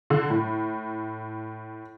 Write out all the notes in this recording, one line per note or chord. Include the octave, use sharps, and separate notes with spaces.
D3
A2